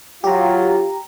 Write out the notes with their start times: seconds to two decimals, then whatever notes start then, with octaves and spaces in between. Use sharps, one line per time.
0.24 F#3 F4 G4 A#5